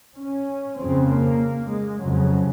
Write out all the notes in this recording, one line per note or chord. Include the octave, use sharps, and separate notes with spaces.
C#4
F2 C#3 C4
A#3
G#3
F2 C#3 F#3